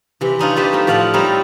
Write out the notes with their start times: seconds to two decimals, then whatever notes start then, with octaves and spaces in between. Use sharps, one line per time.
0.21 C3 E3
0.39 D4 D#4 F4 C#5
0.56 F4 G4 B4 C5 D5
0.73 A3 C4 D#4
0.87 A2 F3 D5 F5 F#5 A5
1.14 G3 C4 D#4 E4 A#4 C#5